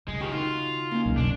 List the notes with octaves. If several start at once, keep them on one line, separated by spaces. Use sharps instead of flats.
C#3 G#3
D#3 C#4 F4 G4
D#4 F4 F#4
A#3 C#4 D#4
C#2 B2
F#2 C4 D4